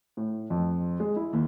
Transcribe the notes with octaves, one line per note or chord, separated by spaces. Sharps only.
A2
F2
G#3
E4
D#2